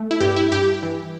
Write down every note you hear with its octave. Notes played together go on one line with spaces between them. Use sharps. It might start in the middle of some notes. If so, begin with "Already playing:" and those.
Already playing: A3
E4
G2 G4
E4
G2 G4
E3